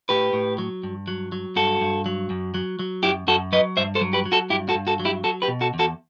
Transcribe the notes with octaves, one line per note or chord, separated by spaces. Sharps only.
A2 G4 B4
A2
F#3
G2
F#3
F#3
G2 F#4 A4
G2
F#3
F#2
F#3
F#3
F#2 E4 G4
F#2 F#4 A4
F#3 B4 D#5
G2 C5 E5
A4 C5
F#3
G4 B4
F#3
F#4 A4
G2 E4 G4
F#4 A4
G2
F#4 A4
F#3
E4 G4
F#3 F#4 A4
G4 B4
B2
F#4 A4
E2
F#4 A4